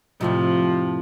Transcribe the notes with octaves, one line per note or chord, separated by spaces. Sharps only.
F2 A2 C3 F3